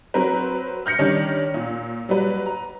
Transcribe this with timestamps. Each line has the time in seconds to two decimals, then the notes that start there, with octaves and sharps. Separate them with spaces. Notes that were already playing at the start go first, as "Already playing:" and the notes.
0.14 F#3 C4 A#4 B4
0.86 F6 G6 A#6 C#7
0.99 D#3 G3 C#4 D4
1.54 A#2
2.09 F#3 G3 B4
2.46 A#5